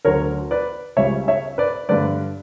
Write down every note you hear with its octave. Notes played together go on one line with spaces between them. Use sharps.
D2 D3 F#3 A#4 C#5
B4 D5
C#2 C#3 G3 C#5 E5
C#5 E5
B4 D5
G2 D3 G3 B4 D5